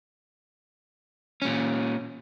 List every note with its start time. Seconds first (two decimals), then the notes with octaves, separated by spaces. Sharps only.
1.42 A#2 C#4